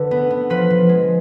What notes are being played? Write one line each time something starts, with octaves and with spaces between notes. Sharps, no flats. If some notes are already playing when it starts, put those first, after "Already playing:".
Already playing: D3 A4 B4
B3
B3
F3 B4
F3
G#3